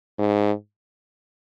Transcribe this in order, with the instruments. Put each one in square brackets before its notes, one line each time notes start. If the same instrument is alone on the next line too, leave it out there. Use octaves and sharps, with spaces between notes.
[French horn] G#2